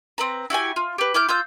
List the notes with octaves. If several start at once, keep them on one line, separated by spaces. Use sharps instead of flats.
C4 B4 A#5
E4 F#4 G4 G#5
F4
G4 B4
E4 D6 F6 G6
F4 E6 G6